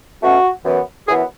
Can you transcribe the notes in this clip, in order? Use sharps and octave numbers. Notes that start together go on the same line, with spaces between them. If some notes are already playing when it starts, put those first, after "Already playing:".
B2 A3 C#4 F#4
F#2 E3 B3
F#2 E3 B3 G#4